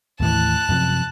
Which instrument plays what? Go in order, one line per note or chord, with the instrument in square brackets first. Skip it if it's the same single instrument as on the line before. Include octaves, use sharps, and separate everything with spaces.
[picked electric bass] D#2 A2 E3 [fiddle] A5 F#6
[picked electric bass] F#2 C3 F3